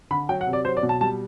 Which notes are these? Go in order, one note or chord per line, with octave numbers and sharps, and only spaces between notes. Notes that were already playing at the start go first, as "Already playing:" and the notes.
D3 B5
F#3 G5
F#5
C3
D5
F#3 C5
D5
B2
A5
G3 A5